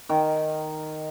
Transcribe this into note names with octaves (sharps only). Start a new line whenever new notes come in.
D#3